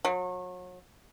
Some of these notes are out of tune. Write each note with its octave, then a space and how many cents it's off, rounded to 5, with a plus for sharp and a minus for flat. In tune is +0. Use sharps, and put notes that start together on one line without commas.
F#3 -35